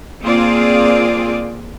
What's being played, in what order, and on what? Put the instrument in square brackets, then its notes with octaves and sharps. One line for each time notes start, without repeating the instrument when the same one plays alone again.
[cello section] A#3 C4 F4 G#4 D5